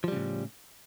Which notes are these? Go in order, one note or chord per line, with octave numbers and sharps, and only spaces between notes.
A2 C#3 F3 G3